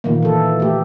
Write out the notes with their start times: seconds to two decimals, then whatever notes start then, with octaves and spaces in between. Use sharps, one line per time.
0.04 A#2 D#3 E3 A#3
0.22 E3 A4
0.60 A3 G4